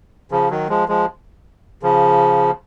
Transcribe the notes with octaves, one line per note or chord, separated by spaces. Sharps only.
C#3 F3
D#3 F#3
F3 G#3
F3 G#3
C#3 F3